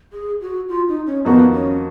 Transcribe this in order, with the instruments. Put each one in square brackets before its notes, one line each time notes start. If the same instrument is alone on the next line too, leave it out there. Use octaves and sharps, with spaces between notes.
[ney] G#4
F#4
F4
D#4
C#4
[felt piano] F2 D#3 A#3 D#4 F#4 [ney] B3
[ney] C#4